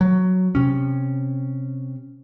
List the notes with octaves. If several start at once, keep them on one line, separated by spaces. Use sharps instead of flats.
F#3
C3 C#4